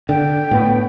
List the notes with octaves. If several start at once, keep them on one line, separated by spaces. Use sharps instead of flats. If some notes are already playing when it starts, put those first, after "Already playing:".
D3 G5
A2 B3